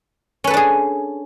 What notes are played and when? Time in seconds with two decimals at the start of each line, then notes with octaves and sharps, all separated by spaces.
0.44 C#4
0.47 B4
0.50 A4
0.54 D4
0.57 G#4